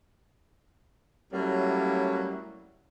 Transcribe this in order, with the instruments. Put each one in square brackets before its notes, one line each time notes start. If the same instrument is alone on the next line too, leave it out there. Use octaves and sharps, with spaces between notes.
[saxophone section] F#3 G3 A3 A#3 C#4 E4